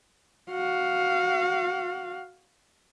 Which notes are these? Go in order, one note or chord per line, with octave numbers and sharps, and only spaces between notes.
F#4 F5